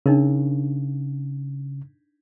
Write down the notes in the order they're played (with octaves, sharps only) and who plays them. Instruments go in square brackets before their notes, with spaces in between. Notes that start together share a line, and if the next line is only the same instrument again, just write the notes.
[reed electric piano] C#3 [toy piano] D4 D#4 A#4